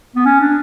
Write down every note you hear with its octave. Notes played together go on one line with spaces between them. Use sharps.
B3
C#4
D4